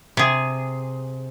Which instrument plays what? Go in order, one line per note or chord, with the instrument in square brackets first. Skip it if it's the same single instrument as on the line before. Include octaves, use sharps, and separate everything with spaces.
[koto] C3 G#4